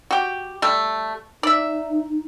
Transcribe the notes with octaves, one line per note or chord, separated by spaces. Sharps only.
F#4 G4
G3 A3
D#4 D5 E5